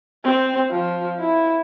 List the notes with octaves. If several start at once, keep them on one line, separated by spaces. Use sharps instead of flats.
C4
F3
E4